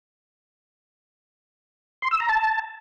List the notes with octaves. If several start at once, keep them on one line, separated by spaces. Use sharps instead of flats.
C6
E6
A#5
A5